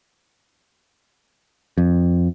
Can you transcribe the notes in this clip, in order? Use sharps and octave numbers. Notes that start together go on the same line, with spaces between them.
F2